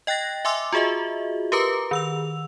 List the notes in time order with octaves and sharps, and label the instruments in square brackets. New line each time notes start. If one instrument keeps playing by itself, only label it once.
[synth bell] D#5 G5 F#6 A6 A#6
E5 G#5 C6 D6 E6
F4 F#4 G#4 D#5 E5
G4 A#4 B4 A#5 D6
D#3 E6 F7